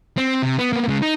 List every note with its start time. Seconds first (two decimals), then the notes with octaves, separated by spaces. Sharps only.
0.17 C4
0.43 C3
0.59 B3
0.73 A#3 B3
0.88 C#3 G#3
1.02 D#4